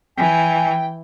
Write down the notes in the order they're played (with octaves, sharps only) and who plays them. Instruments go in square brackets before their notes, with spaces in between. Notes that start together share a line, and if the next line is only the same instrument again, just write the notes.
[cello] E3 [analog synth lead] G5 [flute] G#5